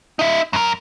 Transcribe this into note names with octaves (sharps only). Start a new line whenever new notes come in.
D#4 E5
F#2 A#4